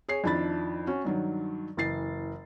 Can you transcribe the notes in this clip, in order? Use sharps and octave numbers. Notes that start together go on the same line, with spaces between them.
G#4 C#5 C7
F2 D#3 D4 E4 B5 A6
C#4 F#4
G2 D#3 F#3
F#1 E3 A6 C7